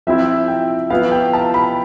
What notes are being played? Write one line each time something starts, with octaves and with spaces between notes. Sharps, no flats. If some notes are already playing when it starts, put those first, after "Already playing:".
F3 C4 E4 E5
G5
F3 B3 E4 F5
G5
A5
B5